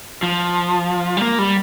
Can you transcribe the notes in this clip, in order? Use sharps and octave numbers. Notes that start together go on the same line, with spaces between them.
F3
G3
A#3
G3